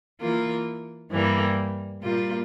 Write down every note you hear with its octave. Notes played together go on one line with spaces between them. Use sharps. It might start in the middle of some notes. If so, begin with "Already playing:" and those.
E3 A#3 F4
G2 E3 G3 A#3
A#2 G3 A#3 F4